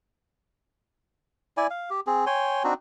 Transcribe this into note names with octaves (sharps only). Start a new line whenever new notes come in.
E4 D5 G#5
F5
G4
C4 G#4
C#5 G5 G#5 C6
C4 D4 D#4 F#4